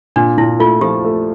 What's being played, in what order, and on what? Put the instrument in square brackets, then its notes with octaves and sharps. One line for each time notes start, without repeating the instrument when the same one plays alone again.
[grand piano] A#2 [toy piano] D4
[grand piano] A#2 [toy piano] E4
[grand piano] A3 [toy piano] F4
[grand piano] F3 [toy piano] G4
[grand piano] A3